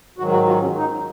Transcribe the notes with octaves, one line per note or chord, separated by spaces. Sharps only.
G#2 D#3 F#3 F#4
F#4
F4
C#4
D#4